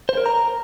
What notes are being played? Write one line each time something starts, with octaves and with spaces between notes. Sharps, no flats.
C5
A#4
A#5